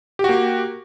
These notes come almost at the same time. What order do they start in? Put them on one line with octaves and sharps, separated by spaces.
G4 F#4 A#3